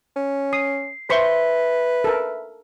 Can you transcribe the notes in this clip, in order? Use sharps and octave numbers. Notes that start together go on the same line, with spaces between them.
C#4
D#6 C7
B4 C5 E5 C6 C#6 B6
A4 A#4